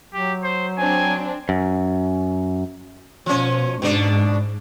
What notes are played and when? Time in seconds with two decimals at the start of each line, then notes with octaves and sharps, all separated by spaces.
0.14 F#3 G4
0.44 C5
0.78 C4 D4 G#5
1.49 F#2
3.26 B2 F3 C#4
3.82 G#2 B2 D4